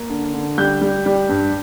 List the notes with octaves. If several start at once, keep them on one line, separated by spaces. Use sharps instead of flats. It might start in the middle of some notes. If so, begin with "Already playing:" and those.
Already playing: A#3
D3
D3
G3 G6
G3
G3
G2